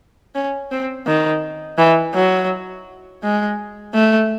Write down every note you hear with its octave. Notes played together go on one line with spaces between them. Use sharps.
C#4
C4
D#3
E3
F#3
G#3
A3